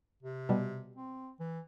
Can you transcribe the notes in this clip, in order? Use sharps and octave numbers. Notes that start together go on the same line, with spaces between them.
C3
B2 G3
C4
E3